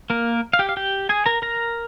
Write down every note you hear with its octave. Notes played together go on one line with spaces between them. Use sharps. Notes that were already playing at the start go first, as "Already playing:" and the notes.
A#3 A#4
F5
G4 G5
F5
G4 G5
G#4 G#5
A#4 A#5
A#4 A#5